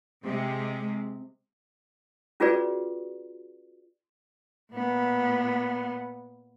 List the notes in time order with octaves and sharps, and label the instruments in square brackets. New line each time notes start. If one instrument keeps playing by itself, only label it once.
[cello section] C3 G#3
[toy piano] C#4 F4 F#4 G#4 B4 D5
[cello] A#2 B3